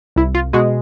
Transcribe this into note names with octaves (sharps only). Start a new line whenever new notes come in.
C2 E4
F4
B2 G#3 F#4